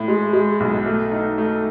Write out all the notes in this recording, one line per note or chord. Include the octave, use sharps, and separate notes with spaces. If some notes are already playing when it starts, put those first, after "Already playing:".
Already playing: A2
G#3
G#3
B1
A3
D#4
A3